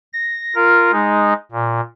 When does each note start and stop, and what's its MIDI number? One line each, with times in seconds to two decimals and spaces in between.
0.13 0.54 94
0.55 0.91 65
0.55 0.91 70
0.92 1.33 56
0.92 1.33 63
1.52 1.81 46